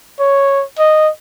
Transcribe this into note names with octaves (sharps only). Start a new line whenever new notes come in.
C#5
D#5